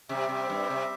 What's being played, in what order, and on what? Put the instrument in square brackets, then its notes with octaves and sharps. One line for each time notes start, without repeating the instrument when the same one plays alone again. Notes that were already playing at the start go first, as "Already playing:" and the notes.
[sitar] C3 [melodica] G3 C4 G4 E5
[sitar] C3
G2
C3